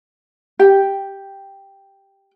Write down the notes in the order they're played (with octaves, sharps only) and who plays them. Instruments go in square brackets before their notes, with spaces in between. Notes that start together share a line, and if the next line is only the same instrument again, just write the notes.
[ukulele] G4 G5